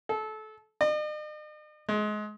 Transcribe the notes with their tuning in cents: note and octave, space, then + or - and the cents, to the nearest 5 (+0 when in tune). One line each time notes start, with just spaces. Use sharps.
A4 -25
D#5 -45
G#3 +25